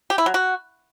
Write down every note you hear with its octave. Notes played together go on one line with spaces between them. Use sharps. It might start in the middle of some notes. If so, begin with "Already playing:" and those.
G4
E4
F#3
F#4